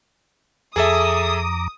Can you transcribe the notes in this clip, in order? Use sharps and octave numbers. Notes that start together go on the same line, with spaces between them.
F2 G#4 A4 E5 A#5 D6 D#6